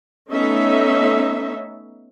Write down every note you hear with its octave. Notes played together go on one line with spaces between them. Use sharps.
A3 B3 C#4 D#4 E5